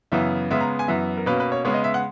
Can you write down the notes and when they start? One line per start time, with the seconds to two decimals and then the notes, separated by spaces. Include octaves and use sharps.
0.12 F#2 C#3 E3 B3 E5
0.51 C#3 G#3 B3 E5
0.60 A#5
0.79 G#5
0.88 F#2 E3 B3 E5
1.17 A#4
1.26 B2 A#3 C#4 B4
1.40 B4
1.52 C#5
1.65 C#3 G#3 B3 C#5
1.74 D#5
1.84 E5
1.94 F#5